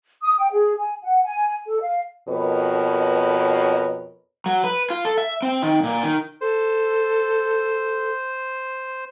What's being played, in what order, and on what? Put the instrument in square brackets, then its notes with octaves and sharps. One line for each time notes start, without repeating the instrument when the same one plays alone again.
[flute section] D#6
G5
G#4
G#5
F#5
G#5
A4
F5
[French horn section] F2 B2 A#4 B4 C#5 D#5
[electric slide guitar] F#3
B4
F4
A4
E5
C4
D#3
A#2
D#3
[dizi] A4 [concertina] C5